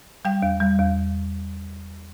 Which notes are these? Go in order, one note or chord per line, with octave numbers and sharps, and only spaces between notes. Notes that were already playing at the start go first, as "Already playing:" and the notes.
G3 G5
E2
G3
E2